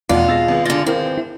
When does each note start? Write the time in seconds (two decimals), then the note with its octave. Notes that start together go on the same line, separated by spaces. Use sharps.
0.09 F1 E2 B2 F4 D5 F#5 D6
0.28 B2 G#3 E6 A6 A#6
0.48 G#1 B3 G#4
0.65 D3 F4 A6 A#6
0.86 C4 E4 A#4 F5
1.18 E4